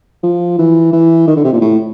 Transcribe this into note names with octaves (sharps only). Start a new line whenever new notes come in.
F3
E3
E3
D#3
D3
C3
A#2
A2